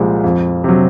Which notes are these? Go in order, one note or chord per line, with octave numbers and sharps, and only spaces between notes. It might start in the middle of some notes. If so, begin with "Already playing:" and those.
Already playing: C2 A#2 F3 G#3
F2
C3 F#3